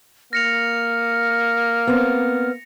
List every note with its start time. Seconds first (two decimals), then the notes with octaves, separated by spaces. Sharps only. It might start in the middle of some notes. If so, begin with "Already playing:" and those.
0.33 A#3 F6 A#6 C#7 F7
1.87 B3 C4